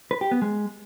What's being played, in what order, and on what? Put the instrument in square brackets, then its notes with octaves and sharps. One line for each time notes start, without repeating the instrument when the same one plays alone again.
[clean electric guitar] B4
G4
B3
G#3